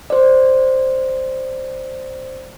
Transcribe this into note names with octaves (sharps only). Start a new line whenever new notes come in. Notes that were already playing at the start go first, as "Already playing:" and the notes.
C5 D5